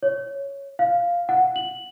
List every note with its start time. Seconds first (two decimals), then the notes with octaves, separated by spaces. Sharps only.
0.03 C#5
0.79 F5
1.29 F#5
1.56 F#7